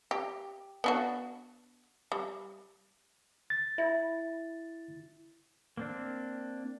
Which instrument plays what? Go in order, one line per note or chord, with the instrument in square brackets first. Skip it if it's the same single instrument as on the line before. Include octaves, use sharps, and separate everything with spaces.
[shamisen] G4
B3 D4 F#4
G3
[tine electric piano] A6
[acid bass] E4 [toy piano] E5
[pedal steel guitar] A#3 C4 D4